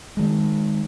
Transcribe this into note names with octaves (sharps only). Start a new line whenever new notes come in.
D#3 G#3